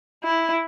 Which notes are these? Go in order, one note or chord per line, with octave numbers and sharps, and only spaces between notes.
E4